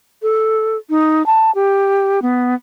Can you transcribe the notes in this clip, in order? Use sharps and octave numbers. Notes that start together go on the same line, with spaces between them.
A4
D#4
A5
G4
B3